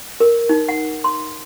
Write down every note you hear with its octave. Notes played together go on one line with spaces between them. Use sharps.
A#4
D#4
F#5
C6